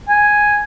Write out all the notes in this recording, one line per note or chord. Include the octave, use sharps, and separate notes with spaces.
G#5